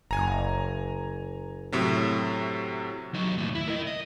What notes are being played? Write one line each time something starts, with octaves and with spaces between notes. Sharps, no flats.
F#1 G#5 A#5
A2 C3 F#3
F#3 D#4
D#2 A2
E4
A#4 D#5
D#5